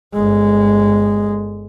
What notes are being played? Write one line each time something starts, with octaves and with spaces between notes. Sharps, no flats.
G1 G#3